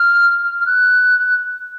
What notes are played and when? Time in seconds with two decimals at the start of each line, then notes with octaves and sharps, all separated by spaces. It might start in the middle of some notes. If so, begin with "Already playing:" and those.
Already playing: F6
0.60 F6
0.66 F#6